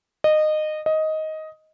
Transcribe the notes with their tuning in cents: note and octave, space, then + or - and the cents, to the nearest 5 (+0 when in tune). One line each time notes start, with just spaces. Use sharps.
D#5 -20
D#5 +10